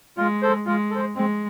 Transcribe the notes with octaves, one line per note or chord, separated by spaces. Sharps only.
G#3 F4
A4 C5
G#3 F4
A4 C5
G#3 C4